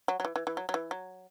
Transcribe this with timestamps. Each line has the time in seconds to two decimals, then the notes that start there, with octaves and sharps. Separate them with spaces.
0.08 F#3
0.20 F#3
0.25 E3
0.36 E3
0.47 E3
0.57 F#3
0.69 F#3
0.74 E3
0.91 F#3